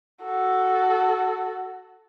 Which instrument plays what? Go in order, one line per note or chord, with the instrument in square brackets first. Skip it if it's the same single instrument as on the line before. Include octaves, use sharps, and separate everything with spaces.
[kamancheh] F#4 A4